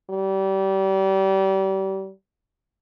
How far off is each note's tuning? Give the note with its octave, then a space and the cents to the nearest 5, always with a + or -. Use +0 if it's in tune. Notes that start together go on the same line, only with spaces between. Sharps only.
G3 -30